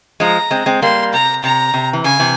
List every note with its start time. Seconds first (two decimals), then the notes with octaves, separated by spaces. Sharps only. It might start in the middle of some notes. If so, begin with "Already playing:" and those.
0.20 F3 G#3 A#5
0.51 G#3 C4
0.66 G#3 C4
0.82 G3 A#3 C6
1.13 C3 A#5
1.43 C3 A#5
1.74 C3
1.93 E3
2.04 C#3 G#5
2.19 C3 E3